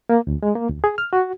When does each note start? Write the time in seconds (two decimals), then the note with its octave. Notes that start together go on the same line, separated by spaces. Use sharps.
0.09 A#3
0.27 D2
0.43 G#3
0.55 A#3
0.68 D2
0.84 G#4
0.98 F6
1.13 F#4